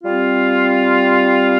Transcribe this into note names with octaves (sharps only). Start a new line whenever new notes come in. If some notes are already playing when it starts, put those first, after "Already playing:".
G3 C4 F4